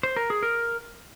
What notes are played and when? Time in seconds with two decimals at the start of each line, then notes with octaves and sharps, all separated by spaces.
0.03 C5
0.16 A#4
0.30 G#4
0.43 A#4